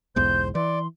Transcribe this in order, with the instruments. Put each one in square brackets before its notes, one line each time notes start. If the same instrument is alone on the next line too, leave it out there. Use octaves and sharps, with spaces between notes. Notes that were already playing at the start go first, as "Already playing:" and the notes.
[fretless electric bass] B1 E2 G#2 [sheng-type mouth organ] C5 [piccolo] G6
[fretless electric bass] E3 [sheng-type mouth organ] D5 [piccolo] C6